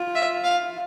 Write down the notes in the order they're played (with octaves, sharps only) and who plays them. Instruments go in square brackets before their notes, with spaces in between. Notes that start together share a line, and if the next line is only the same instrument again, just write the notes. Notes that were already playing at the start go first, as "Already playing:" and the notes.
Already playing: [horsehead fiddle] F4
[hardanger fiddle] E5
F5